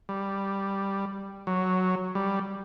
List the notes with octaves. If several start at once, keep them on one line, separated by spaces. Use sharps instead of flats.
G3
F#3
G3